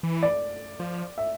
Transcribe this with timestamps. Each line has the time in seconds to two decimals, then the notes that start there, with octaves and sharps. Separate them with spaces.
0.03 E3
0.23 D5
0.80 F3
1.18 E5